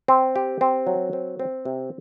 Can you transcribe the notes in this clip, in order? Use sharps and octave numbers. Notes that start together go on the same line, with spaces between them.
C4
G4
C4
F#3
C4
C4
C3